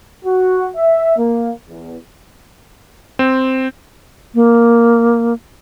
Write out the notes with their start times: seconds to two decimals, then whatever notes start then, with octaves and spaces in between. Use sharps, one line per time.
0.25 F#4
0.76 E5
1.17 A#3
1.69 E2
3.19 C4
4.35 A#3